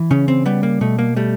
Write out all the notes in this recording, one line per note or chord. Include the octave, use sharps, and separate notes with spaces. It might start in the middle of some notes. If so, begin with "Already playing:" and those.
Already playing: E3
C#3 C#4
C4
G3 B3
A#3
B2 A3
A#3
G3 A3